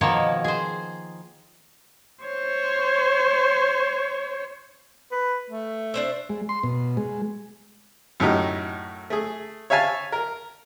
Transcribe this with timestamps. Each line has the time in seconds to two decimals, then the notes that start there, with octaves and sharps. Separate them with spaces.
0.01 B2 D#3 F3 A#3 C#5 A5
0.44 G#4 C5
2.25 C5 C#5
5.12 B4
5.50 A3
5.94 D4 C5 E5
6.29 G#3
6.49 C6
6.63 B2
6.97 G#3
8.20 F#2 A2 D#4 G4
9.10 A3 G#4
9.70 C#5 E5 F5 G#5 A5
10.12 A#4